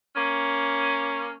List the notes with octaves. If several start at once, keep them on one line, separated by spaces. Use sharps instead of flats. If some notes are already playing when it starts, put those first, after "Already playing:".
A#3 C#4